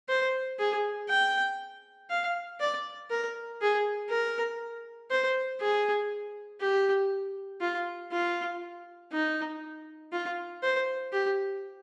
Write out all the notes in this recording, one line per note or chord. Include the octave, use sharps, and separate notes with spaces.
C5
G#4
G5
F5
D5
A#4
G#4
A#4
C5
G#4
G4
F4
F4
D#4
F4
C5
G4